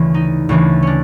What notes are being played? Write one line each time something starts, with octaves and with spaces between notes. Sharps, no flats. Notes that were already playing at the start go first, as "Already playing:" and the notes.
Already playing: D2 C#3 E3
D#4
D2 C#3 E3 D4
C#4 D4